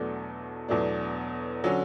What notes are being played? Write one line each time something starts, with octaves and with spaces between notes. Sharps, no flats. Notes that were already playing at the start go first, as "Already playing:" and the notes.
Already playing: E2 B2 F#3 A3 D4
E2 B2 F#3 A3 D4
D3 F#3 C#4